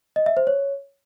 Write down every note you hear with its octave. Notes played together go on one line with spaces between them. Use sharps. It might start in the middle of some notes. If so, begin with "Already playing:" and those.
D#5
E5
C5
C#5